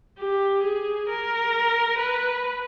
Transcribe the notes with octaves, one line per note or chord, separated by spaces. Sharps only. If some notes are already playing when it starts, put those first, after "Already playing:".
G4
G#4
A#4
B4